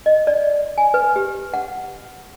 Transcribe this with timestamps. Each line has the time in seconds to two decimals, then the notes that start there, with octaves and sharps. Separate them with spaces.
0.06 D#5
0.27 D5
0.78 G#5
0.94 B4
1.16 G4
1.54 F#5